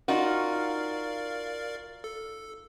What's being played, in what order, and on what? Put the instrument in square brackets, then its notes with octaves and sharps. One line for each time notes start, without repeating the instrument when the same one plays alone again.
[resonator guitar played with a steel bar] D#4 F4 F#4 [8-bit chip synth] A#4 D5 F5
[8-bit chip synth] A4